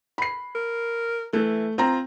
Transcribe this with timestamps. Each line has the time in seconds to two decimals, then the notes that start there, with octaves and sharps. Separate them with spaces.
0.18 B5 C7
0.55 A#4
1.33 E3 A3
1.78 C4 F4 A#5